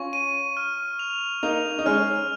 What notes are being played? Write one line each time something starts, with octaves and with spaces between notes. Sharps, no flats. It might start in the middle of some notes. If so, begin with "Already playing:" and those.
Already playing: C#4 F4 C#6
D#7
F6
F7
A#3 D#4 F7
D#4
G#3 C#4 F6